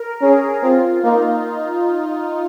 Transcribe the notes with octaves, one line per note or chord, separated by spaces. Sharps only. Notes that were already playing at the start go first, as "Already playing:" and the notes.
Already playing: A#4
C#4 G#4
C4 F4
A#3 D#4